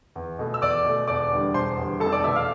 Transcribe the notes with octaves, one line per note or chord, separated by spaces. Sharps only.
E2
B2 A3
E6
E2 D5 D6
B2 A3
E1 D5 D6
E2 D3 G3
E1 C5 C6
E2 D3 G3
F1 A4 A5
D5 D6
E2 B2 A3 E5 E6
F5 F6